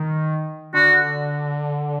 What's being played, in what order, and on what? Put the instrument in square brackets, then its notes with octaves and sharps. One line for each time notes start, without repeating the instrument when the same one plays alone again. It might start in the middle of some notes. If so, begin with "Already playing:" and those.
Already playing: [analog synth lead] D#3
[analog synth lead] D3 [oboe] F#4